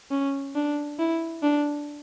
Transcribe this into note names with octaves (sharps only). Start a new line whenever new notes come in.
C#4
D4
E4
D4